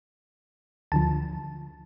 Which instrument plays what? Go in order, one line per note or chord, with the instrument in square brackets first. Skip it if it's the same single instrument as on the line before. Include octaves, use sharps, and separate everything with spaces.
[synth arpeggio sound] D2 D3 F3 A5